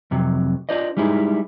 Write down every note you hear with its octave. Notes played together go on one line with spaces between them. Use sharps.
F2 C3 F#3
D4 F4 C5 D5 D#5
G3 G#3 D#4 E4 G#4